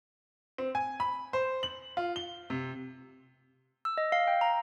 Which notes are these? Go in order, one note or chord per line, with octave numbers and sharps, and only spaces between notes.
C4
G#5
B5
C5
F#7
F4
G7
C3
E6
D#5
F5
G5
A#5